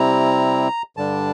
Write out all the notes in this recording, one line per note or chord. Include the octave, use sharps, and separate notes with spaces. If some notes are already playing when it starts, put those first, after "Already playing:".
Already playing: C3 G3 C4 E4 A#5
G2 D3 G3 D4 A5